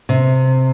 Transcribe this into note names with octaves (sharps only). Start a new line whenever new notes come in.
C3